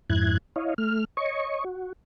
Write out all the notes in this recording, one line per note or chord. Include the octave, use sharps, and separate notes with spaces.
F2 G#2 E4 F#6 G#6
E4 C#5 D#5 F5
A3 F6
C#5 D#5 C#6
F#4